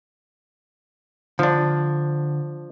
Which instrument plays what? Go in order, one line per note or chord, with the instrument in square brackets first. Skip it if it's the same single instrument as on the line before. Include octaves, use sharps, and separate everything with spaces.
[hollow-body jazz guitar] D3 [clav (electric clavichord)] F3 D4